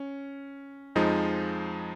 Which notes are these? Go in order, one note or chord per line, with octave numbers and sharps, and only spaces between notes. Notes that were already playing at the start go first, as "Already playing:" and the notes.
Already playing: C#4
F2 F3 G#3 D#4